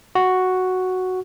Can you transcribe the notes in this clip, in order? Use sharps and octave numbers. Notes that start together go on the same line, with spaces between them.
F#4